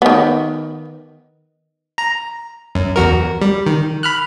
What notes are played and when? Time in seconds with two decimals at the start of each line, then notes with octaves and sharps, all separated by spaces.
0.02 D#3 B3
1.98 A#5
2.75 F#2
2.96 E2 F#4 A#4
3.41 G3
3.66 D#3
4.03 B5 F6 F#6